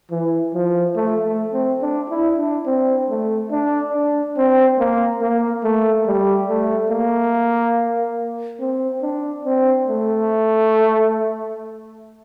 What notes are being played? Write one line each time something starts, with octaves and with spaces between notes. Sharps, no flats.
E3
F3
A3
A3
C4
D4
E4
D4
C4
A3
D4
D4
C4
A#3
A#3
A3
G3
A3
A#3
C4
D4
C4
A3